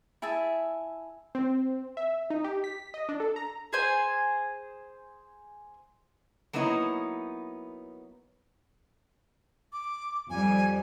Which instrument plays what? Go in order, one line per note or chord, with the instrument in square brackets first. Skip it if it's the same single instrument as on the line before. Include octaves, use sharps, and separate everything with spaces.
[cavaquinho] E4 G#4 E5 A5
[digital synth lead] C4
E5
D#4
G4
B6
D#5
D4
A4
A#5
[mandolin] G#4 C5 G#5
[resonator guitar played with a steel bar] F#3 A#3 B3 D#4 E4 C#5
[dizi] D6
[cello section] F2 G3 [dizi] G#5